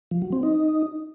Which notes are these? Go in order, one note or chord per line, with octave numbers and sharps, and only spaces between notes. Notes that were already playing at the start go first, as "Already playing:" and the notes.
F3
F#3
C4
D#4